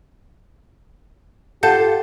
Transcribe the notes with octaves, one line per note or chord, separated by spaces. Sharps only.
F4 G4 A4 F#5 A5 G6